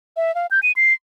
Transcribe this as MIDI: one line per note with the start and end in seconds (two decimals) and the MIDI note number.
0.17 0.34 76
0.35 0.47 77
0.51 0.60 91
0.63 0.72 99
0.76 0.93 96